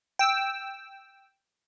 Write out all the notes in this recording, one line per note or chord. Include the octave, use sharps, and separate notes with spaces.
G5 E6